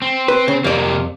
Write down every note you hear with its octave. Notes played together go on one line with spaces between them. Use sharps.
C4
B4
C#3
F2 C3 G3 A#3 D5